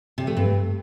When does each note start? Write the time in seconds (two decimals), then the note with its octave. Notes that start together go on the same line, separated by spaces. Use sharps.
0.18 C3
0.27 A3
0.37 G2